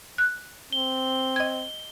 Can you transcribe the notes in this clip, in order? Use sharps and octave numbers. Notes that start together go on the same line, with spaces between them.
F#6
C4 G7
D#5 G#6